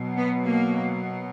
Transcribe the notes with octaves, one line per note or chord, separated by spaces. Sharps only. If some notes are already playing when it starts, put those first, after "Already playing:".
Already playing: B2 F#3
B3
A#3